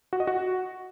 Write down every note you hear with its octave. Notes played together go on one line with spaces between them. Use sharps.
F#4
D#5
F#4